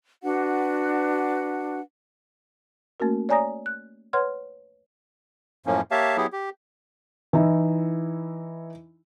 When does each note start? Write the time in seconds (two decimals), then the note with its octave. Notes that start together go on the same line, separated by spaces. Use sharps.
0.23 D4 F#4 B4 F#5
3.00 A3 A#3 C#4 F#4 A#4
3.29 C#5 D5 G#5 A#5 D#6 A#6
3.66 F#6
4.13 B4 C#5 F#5 C6 F6 G#6
5.66 F#2 A2 F3 A#3 C#4
5.91 A#3 G4 C#5 E5 F5 A5
6.17 F#3 B3 E4 G4 G#4
6.33 G4
7.33 E3 D#4 E4